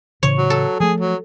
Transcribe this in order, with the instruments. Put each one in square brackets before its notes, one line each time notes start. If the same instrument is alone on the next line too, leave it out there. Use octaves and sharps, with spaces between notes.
[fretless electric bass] A2 C#3 E3 [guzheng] C#5
[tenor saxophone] F#3
[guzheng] A4
[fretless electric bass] F3 A3 [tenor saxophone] G#4
[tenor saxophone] F#3